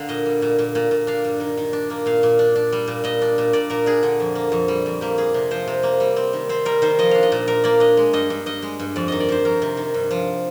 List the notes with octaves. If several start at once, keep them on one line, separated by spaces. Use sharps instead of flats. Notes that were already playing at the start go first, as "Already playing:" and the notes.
Already playing: D3 A#4 F5
A#2 D#5
G3
A#2
A#2
A#2
A#2
D4 F5
G2
D#3
D#3
D4
A#3
A#2 F5
A#2
D4
D4
G3
A#2
A#2 D#5
D4
A#2
A#2 D5
A#2 A#4
D4 G#4
D3
F2
A#3
F2
G3
F2
A#3 G4
A#3 G#4
C3
F3 C5
C3
A#3
G3
C4
D#3
C4 C5
G3 A#4
D#3 C5
F3 D#5
D4 F5
D#5
A#2
A#2 A#4
A#3 D5
D4 D#5
G#3
G2 D#5
G2
G2 D#5
G#3
G2
F2 D5
D#3 D#5
D5
D#3 C5
F2 A#4
C3
D#3
G2
F3